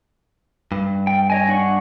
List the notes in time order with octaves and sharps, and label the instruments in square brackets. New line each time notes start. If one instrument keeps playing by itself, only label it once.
[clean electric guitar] G2
[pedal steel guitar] G5
C#5 D#5 G#5
D4 F#5 C#6